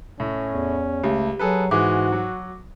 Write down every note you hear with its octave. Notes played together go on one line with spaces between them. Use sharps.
A2 C#4
E2
C#2 A3 G4
F#3 G#4 A4 B4
G#2 E3 G#3 F#4 D6
F#3